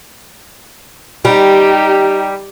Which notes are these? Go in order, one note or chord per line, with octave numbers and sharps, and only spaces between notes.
G3 D#4 G4